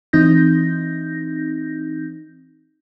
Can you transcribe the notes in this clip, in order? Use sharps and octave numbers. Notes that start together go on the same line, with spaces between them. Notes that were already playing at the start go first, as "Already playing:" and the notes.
E3 C4 D#4 G6 A#6